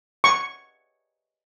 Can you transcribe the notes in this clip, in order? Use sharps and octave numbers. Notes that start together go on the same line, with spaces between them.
C#6